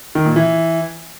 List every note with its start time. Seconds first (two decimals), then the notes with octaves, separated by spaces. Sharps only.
0.15 D#3
0.26 A#2
0.36 E3